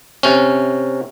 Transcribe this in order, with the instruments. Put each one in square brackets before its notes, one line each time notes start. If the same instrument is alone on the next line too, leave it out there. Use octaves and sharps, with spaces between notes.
[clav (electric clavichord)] C3 C#4